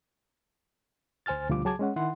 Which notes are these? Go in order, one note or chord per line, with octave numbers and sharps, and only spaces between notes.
D2 C5 G#5 F6 A6
D2 B2 F3 G3 F4 D6
C#2 F#3 G#4 A5 D6 G#6
G#3 C#4 F#5
D#3 E4 F#5 C6